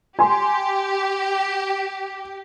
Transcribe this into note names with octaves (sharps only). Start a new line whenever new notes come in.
G4 G#5 C6